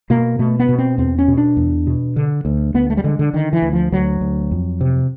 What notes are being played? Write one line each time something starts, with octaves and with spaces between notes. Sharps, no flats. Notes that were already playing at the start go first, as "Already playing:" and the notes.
B2 A#3
B2 A3
B3
B2
C4
E2 C4
C#4
B2
D4
E2
B2
D3
D2
D2 B3
A3
G3
D3 G#3
D3
D3 D#3
E3
D2
F3
D2 F#3
D2
F2
C3